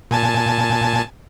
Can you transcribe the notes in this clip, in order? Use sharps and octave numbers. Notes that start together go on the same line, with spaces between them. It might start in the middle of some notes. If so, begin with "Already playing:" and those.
A#2 G#5 A5